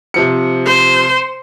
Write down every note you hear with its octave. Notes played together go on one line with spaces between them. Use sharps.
C3 F3 C#7
C5